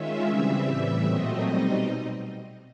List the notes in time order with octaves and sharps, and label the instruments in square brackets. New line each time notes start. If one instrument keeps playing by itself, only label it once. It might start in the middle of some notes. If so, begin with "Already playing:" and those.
Already playing: [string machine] D#3 G#3 C#4 F4 E5
C#3 E3 G3 C4
A2 E3 G3
A#2 F#3 A3 C4 D#5
B2 G3 C4 D#4